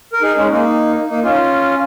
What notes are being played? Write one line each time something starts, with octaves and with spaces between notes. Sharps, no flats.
A#4
D#4 G#4
G#3 C#4
A#3 D#4
A#3 D#4
C#4 F4